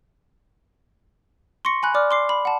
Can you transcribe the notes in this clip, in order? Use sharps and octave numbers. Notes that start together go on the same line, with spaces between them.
C6 C#6 A#6 C#7
G#5 B5 F#6
D5 D6 F6
C6 D6 C7
B5
F#5 A5